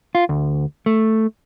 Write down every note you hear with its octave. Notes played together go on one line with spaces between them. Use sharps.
F4
D2
A3